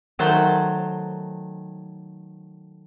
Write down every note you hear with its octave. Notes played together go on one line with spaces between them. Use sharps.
D#3 F#3 A3 C5